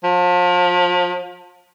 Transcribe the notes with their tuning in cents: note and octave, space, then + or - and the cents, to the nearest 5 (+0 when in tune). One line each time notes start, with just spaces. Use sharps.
F3 +35